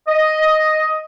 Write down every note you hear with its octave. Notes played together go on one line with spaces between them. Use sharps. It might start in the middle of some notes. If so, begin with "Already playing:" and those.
D#5